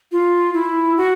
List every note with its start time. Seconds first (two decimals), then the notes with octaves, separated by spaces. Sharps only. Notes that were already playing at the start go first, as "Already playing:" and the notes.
0.12 F4
0.54 E4
0.97 F#4